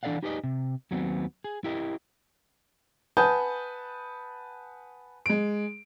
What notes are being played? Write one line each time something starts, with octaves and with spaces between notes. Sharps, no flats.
E3 D4 A4 D5 F5 F#5
D#4 G4 G#4 B4 D5 D#5
C3
D#2 F#3 B3 C4
G#4
E4 G4 A#4 D#5
B4 F#5 G#5 A5 D#6 G6
G#3 D7